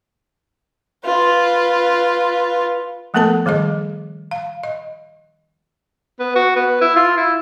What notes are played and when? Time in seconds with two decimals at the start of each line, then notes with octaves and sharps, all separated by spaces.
1.05 F4 B4
3.14 F3 A3 B3 A4 A#4 A5
3.46 D#3 G3 G#4 D#5
4.31 F5
4.63 D#5
6.20 B3
6.36 F#4
6.56 B3
6.81 E4
6.96 F4
7.17 E4